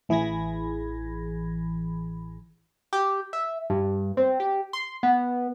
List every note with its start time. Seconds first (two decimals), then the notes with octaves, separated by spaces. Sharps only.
0.09 A1 E3 G#4 B5 G#6 A#6
2.93 G4
3.33 E5
3.70 G2
4.17 C4
4.40 G4
4.73 C6
5.03 B3